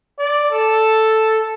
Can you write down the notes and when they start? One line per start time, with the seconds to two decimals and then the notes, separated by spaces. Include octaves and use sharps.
0.19 D5
0.51 A4